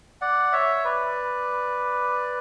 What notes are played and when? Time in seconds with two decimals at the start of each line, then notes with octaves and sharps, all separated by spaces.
0.21 D5 F#5
0.52 C#5 E5
0.85 B4 D5